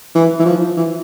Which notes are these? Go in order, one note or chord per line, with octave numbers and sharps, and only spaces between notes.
E3
E3
F3
E3